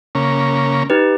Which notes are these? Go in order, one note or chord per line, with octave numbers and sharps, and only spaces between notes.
C#3 A#3 C#4
D#4 G4 B4